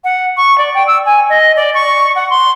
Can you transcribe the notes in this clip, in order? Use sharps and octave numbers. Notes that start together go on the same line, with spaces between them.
F#5
C#6
D5
G5
E6
G#5
D#5
D5
C#6
F#5
C6